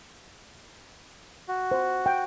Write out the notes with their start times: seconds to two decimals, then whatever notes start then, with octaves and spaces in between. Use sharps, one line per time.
1.48 F#4
1.71 C5
2.06 G5